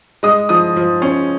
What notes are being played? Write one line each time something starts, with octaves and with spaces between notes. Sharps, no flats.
G#3 D#6
F3 D#6
F3
C#4